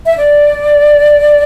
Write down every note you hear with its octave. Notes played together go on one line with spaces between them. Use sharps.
E5
D5